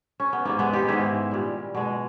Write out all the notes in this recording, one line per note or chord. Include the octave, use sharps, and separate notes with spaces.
C#4
B3
G#2 E3 G#3 A#3
G#3 B3
D#4 G4
G#2 D#3 G#3 E4 G#4
A#2 G3
B2 G#3